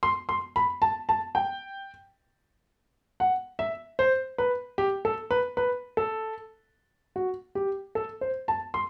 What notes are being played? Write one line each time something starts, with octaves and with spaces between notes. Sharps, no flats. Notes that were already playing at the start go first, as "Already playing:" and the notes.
C6
C6
B5
A5
A5
G5
F#5
E5
C5
B4
G4
A4
B4
B4
A4
F#4
G4
A4
C5
A5
C6